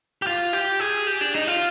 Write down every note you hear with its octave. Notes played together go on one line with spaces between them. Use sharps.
G4
F4
G4
G#4
G4
D4
D#4
F4